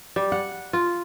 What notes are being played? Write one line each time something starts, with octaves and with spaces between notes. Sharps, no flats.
G3
F#5
F4